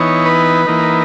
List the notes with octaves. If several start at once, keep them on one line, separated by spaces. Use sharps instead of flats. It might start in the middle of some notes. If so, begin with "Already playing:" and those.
Already playing: E3 B3 D#4 C#5
B4
E3 A#3 D#4